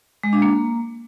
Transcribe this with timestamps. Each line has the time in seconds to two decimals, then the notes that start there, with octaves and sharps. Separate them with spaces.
0.23 G#3
0.33 D4
0.42 A#3